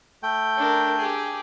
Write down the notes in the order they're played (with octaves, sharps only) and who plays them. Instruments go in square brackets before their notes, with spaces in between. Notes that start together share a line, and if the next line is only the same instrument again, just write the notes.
[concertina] A3 G5
[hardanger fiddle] D4 A#4
G4 G#4